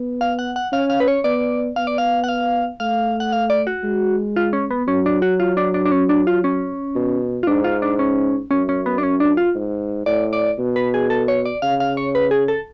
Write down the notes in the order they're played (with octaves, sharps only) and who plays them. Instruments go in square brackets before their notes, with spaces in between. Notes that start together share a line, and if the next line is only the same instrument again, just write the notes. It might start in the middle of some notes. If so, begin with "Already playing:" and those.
Already playing: [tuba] B3
[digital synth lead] F5
F#5
F#5
[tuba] C#4 [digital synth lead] F5
[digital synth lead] F5
B4
C#5
[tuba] B3 [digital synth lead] D5
[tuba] B3 [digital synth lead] F5
[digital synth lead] D5
F5
F#5
F5
[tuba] A3 [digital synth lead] F5
[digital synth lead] F#5
F5
D5
F#4
[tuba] G#3
[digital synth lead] F4
C#4
B3
[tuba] F#3 [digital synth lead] C#4
[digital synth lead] D4
F#4
F4
D4
D4
D4
C#4
D4
F4
C#4
[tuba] B2
[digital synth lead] F4
[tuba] G#2 [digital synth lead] D4
[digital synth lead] F4
D4
C#4
[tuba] F#2 [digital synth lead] C#4
[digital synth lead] C#4
B3
D4
C#4
D4
F4
[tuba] G#2
[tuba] A2 [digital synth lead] D5
[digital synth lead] D5
[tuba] B2
[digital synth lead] B4
G#4
A4
C#5
D5
[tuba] C#3 [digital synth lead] F5
[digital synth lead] F5
C#5
B4
G#4
A4